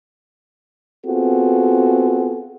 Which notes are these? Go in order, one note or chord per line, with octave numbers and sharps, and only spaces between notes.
B3 C4 F4 F#4 G#4 A4